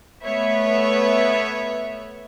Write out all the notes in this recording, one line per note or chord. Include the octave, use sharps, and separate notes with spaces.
A3 B3 B4 C#5 E5